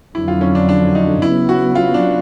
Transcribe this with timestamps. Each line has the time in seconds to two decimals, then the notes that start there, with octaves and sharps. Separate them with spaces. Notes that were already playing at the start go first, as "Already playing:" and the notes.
0.14 F2 D3 F#3 E4
0.28 F4
0.41 C#4
0.55 D4
0.69 D4
0.95 D#4
1.22 C#3 F#3 B3 E4
1.49 F#4
1.75 F4
1.94 D4